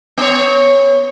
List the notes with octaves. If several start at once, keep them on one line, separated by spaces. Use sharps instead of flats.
B3 C#5